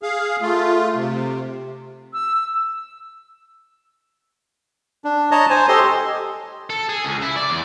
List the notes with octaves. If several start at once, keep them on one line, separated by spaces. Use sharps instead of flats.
G#4 F5
A3 F4
C3
E6
D4
C#5 D#5 A5 A#5
C5 G#5
G4 A4 D#5 C6
A4
G#4
C#2
E4
D5
E2